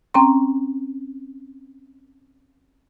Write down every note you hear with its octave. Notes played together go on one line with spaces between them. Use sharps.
C4 C#4 G5 A#5 C6